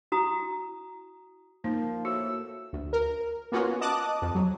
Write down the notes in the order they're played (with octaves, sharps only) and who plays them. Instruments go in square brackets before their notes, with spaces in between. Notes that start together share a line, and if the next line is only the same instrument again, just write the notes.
[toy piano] E4 F#4 A#5 D#6
[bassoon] F3 [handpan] A#3 [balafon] D#4
[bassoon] A2 [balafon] F#4 [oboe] E6
[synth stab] D2
A#4
A#3 B3 C#4 F4 F#4
D#5 A5 D6 D#6 F#6
F2
F#3